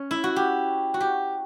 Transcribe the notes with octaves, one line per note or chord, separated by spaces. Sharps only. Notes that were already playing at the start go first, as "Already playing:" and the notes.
Already playing: C#4
E4
F#4
G4
F#4
G4